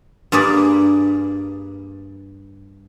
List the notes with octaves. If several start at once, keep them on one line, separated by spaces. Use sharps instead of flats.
G2 A#3 G#4 B4 D5